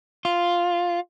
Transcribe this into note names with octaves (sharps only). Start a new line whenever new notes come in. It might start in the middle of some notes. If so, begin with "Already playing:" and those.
F4